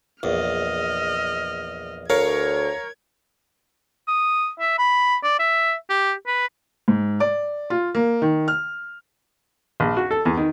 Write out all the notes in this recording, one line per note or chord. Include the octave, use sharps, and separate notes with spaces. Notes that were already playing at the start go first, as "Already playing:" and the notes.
A#1 E2 D#5 F6
D2 A#4 C#5 F5 G#6
D#6
E5
B5
D5
E5
G4
B4
G#2
D5
F4
A#3
D#3
F6
A#1
F#4
A4
E2
D#3